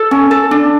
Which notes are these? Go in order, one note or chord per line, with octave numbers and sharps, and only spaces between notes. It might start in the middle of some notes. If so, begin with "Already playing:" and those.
Already playing: A4
C#4
A4
D4